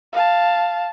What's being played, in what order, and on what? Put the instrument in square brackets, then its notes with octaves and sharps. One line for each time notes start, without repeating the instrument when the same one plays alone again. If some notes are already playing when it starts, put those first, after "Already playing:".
[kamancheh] F5 A5